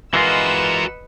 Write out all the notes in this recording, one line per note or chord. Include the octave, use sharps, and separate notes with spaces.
E3 G#3 F4 F#4 A#4 B4 D#5 E6